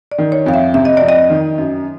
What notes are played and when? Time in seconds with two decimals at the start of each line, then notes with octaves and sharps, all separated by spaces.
0.12 D5
0.18 D#3
0.32 C#5
0.46 F2 F5
0.54 E5
0.74 C3 E5
0.85 D#5
0.97 F2 D5
1.09 D#5
1.30 D#3
1.58 F#2